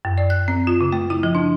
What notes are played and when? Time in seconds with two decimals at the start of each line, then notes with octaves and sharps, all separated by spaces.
0.05 F#2
0.18 D5
0.30 F#6
0.48 C4
0.67 F4
0.81 C#3
0.92 A3
1.10 E4
1.23 F3
1.35 D4